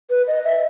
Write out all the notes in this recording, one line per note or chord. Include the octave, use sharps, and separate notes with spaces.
B4
D#5
E5